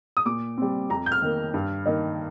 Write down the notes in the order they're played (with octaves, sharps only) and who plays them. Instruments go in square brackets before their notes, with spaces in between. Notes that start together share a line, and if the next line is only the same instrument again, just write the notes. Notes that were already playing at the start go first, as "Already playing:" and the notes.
[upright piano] D#6
A#2 D6
G3 C4
F2 A#5
G6
F6
D#3 A#3
G2
D#3 A#3 D#4